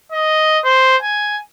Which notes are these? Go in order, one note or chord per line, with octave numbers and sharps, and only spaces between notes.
D#5
C5
G#5